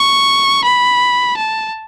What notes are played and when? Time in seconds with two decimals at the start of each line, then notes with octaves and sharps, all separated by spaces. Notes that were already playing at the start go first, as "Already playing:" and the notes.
Already playing: C#6
0.64 B5
1.37 A5